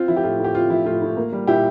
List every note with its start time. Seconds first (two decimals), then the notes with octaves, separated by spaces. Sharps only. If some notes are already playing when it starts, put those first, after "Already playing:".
Already playing: C4 F4
0.08 F3 E4
0.16 G4
0.23 A2 F4
0.39 A2
0.44 G4
0.55 C4 F4
0.70 F3 E4
0.86 A2 F4
1.02 A2
1.17 A#3
1.32 G3
1.47 A#2 E4 G4